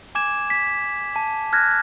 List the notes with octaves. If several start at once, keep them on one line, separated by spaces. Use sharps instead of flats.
G#5 D6 G#6 E7
B6 E7
A5
F6 F#6 G#6 A#6